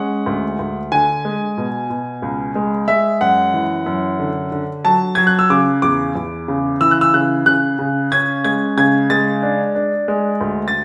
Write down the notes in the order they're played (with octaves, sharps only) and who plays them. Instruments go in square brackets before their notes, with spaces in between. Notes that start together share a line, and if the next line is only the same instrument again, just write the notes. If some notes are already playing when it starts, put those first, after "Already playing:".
Already playing: [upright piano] G#3 C#4 F#5
D2
D2
D3 G#5
G#3
B2
B2
C#2
G#3
G#3 E5
F#2 F#5
E3
F#2
D3
D3
F#3 A5
F#3 G#6
F#6
E6
C#3 D6
E2 D6
E2
C#3
E3 E6
F#6
E6
C#3 F#6
C#3 F#6
C#3
C#4 G#6
G#3 G#6
C#3 G#6
G#3 A6
D4
D4
G#3
D2
A6